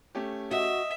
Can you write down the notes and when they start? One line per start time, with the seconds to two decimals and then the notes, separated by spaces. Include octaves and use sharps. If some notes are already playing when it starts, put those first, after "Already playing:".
0.15 A3 C#4 G4
0.51 F#4 D#5 E5